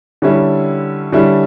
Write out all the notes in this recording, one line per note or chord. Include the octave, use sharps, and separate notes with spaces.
D3 G3 C#4 E4
D3 G3 C#4 E4